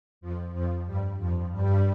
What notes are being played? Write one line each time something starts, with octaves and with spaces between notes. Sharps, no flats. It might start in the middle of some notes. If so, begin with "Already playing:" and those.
F2 F3
F2 F3
G2 G3
F2 F3
G2 G3